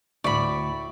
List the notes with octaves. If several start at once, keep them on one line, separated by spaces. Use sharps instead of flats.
D2 A2 D5 E5 B5 C#6